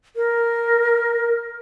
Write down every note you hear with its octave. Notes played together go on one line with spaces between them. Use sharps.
A#4